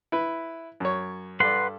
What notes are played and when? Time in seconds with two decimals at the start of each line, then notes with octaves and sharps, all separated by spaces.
0.12 E4 B4
0.80 F#2 C#5
1.40 G2 A4 B4 D5 F#5 C6